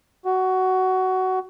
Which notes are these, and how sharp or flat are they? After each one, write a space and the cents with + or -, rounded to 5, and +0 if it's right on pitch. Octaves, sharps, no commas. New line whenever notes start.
F#4 +15